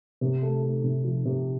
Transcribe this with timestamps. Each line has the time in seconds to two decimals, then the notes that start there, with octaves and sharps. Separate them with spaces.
0.21 C3
0.42 A3
0.63 A3
0.84 C3
1.04 F3
1.25 C3